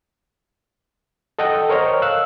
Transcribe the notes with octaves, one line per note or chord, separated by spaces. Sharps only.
A4 D#5 F#5 G5
A#4 C5 C#5 D#5 C#6 F6
F5 E6 F#6